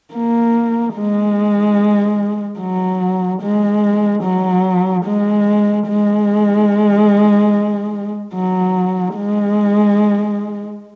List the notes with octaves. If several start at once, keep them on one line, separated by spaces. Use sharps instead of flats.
A#3
G#3
F#3
G#3
F#3
G#3
G#3
F#3
G#3